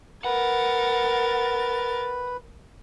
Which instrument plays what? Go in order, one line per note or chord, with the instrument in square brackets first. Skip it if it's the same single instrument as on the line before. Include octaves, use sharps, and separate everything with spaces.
[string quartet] A#4 A6 [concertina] B4 [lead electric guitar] F#5